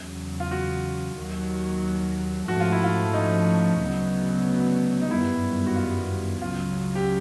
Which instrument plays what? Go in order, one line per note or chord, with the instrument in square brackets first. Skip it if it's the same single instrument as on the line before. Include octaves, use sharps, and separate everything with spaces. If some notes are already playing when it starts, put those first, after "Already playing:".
Already playing: [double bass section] E2 C#3 F#3
[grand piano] F4
F#4
[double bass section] D#2 D#3 F#3
[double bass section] G#2 F3 A3 C#4 [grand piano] F#4
[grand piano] F4
E4
F4
D#4
[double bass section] D2 C#3 F#3 B3
[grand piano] D#4
[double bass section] G1 F#2 D#3 G3 B3 [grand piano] E4
[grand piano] F#4
F4
[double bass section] C#2 C#3 F#3 [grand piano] F4
[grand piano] G4